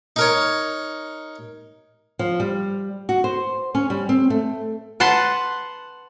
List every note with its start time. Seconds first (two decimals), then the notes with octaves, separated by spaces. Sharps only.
0.16 D#4 A#4 C#5
2.19 F3
2.40 G3
3.09 F#4
3.24 C5
3.75 C#4
3.90 G3
4.09 C4
4.30 A3
5.00 B4 F#5 A5 C6